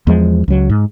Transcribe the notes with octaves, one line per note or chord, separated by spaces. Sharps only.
E2 F3 G#3
C#2 F#3
G#2